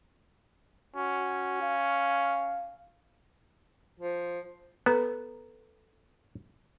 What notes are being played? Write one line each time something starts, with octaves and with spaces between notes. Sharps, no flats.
C#4 F#4
F5
F3
B3 A4 B4 A#5